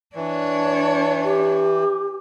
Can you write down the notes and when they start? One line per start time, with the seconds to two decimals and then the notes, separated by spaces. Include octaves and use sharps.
0.16 E3 D4 C#5
1.24 G4